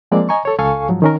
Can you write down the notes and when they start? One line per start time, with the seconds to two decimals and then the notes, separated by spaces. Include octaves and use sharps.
0.12 F3 G#3 A#3 C4 D5
0.29 D#5 G#5 A#5 C#6
0.45 A4 C#5
0.59 C#2 A4 F5 G#5 C#6
0.89 G#2 F3 F#3
1.02 D#3 C#4 A#4